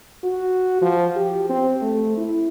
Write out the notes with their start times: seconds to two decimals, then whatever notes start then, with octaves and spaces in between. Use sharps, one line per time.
0.24 F#4
0.82 F3
1.16 G4
1.50 C4
1.82 A3
2.17 E4